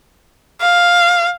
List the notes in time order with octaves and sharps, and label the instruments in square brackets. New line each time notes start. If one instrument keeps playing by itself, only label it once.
[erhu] F5